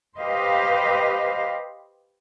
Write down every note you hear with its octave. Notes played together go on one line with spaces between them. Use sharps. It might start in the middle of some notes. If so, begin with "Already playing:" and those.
G4 B4 C5 D#5 F5